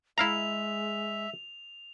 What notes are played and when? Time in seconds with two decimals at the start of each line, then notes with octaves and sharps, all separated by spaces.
0.18 G#3 E4 E5 F5 A#5 F7